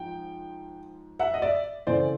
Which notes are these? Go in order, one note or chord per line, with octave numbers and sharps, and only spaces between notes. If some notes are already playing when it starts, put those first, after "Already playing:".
Already playing: G#2 F3 G5
E5 F#5
D#5
D5 E5
C#3 E3 A3 C4 C5 D5